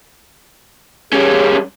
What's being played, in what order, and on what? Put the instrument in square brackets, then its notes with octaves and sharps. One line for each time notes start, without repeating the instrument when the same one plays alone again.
[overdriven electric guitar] G3 C#4 [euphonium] G#4